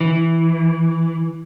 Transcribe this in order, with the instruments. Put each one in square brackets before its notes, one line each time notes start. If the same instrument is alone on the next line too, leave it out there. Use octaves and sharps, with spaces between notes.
[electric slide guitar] E3